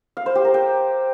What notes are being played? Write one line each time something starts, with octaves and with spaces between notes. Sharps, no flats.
F5
C5
G4
A#4
G5